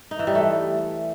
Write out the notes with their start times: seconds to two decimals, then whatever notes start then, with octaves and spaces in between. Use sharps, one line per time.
0.11 D#4
0.19 E3
0.27 G3
0.35 A3